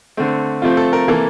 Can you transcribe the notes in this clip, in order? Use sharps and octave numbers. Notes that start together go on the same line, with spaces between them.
D3 A3 C4
C3 F3 A3 C4 F4
A4
A#4
C3 E3 A#3 A4